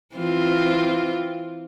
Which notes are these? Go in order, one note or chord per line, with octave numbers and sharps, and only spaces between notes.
E3 C4 F4